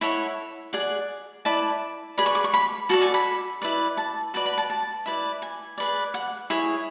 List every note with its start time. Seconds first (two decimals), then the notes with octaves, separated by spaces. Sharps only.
0.01 E4 A4 C#5 F#5
0.73 G#4 D5 F#5
1.45 E4 B4 D5 A5
2.18 G#4 B4 D5 B5
2.26 C#6
2.35 D6
2.44 C#6
2.54 B5
2.89 F#4 A4 D5 A5
3.01 G#5
3.14 B5
3.62 E4 B4 D5
3.97 A5
4.34 F#4 B4 D5 A5
4.46 B5
4.58 A5
4.70 A5
5.06 E4 B4 D5
5.42 G#5
5.78 G#4 B4 D5
6.14 F#5
6.50 E4 G#4 C#5 G#5